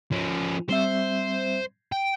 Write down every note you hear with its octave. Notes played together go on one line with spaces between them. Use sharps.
F3 C#4
G3 C4 C5 E5
G5